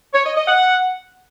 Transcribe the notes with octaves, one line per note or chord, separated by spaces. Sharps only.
C#5
D#5
D#5
F#5